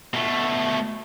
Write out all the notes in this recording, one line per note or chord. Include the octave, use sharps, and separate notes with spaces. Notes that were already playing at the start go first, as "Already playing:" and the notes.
B2 A3